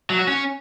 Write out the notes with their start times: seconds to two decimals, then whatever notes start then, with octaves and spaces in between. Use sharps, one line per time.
0.10 F#3
0.19 F#4
0.28 C#4